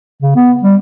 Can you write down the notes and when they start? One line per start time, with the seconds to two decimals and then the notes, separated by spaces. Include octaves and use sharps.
0.22 C#3
0.36 B3
0.63 G3